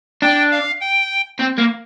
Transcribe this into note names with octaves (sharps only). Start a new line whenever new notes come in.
D4 G5
F5
G5
C4
A#3